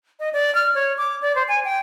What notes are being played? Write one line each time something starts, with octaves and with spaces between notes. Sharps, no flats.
D#5
D5
F6
C#5
D6
D5
C5
G#5
G5